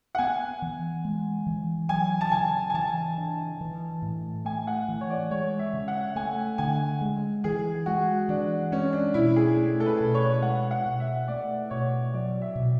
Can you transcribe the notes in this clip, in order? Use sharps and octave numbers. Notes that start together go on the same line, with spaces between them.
F#5
B3 G#5
E3
G#3
E3
F#3 G#5
A5
C#3 G#5
G#5
E3 A5
D4
E3
A2
A3 G#5
F#5
E3
C#5
D5
G#3 C#5
E5
C#3
F#5
A3 G#5
D3 G#5
G#3
E3 G#4
G#3 F#4
E3 D4
G#3 C#4
D4
B2 E4
G#4
A3
A4
B4
B2
C#5
G#3 F#5
F#5
B2
E5
A3 D5
B2 C#5
F#3 D5
E5
B2